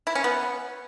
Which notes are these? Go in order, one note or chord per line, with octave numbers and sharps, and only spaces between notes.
E4
C#4
B3